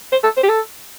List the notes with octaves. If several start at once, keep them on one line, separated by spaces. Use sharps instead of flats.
C5
A4
C5
G4
A4